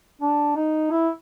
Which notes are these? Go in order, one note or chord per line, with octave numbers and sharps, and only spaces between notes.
D4
D#4
E4